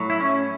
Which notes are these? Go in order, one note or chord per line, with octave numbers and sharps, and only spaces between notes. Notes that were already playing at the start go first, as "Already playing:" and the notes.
Already playing: A2 F#3
E4
C#4